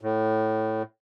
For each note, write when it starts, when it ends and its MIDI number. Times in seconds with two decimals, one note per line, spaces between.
0.01 0.83 45